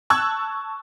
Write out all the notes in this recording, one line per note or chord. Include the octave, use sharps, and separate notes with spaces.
A5 C#6 E6 F#6 G#6